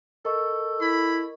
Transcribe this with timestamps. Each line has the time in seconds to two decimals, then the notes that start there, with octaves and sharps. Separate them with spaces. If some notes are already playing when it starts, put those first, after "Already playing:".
0.25 A4 A#4 D#5 C#6
0.81 E4 B5